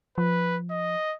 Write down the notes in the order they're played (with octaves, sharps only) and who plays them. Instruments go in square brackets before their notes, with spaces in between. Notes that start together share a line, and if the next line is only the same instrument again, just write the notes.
[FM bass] F3 [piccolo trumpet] B4
[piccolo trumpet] D#5